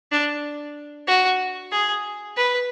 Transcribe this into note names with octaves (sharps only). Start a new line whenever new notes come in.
D4
F#4
G#4
B4